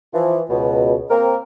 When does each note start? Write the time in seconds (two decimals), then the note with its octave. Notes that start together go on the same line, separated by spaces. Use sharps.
0.13 E3 F3
0.49 C#2 B2
1.10 A#3 C4 A#4